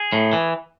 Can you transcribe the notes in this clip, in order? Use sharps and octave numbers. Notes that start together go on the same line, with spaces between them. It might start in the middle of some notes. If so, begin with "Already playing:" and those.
Already playing: G#4
A2
E3